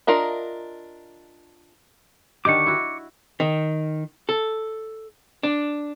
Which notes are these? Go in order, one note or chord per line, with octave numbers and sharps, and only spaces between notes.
D4 F4 A#4 D#5 E5
D3 D#3 G4 C#6 D6
E4 F#4
D#3
A4
D4